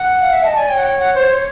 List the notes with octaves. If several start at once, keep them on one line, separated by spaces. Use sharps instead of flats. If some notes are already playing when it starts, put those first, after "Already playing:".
Already playing: F#5
F5
E5
D#5 A5
D5 G#5
C#5 G5
F#5
G5
F#5
C5